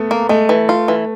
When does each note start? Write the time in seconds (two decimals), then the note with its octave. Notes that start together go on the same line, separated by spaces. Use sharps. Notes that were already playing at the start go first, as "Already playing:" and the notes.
Already playing: A3 B3
0.11 A#3
0.29 G#3 A3
0.49 E3
0.69 F4
0.88 E3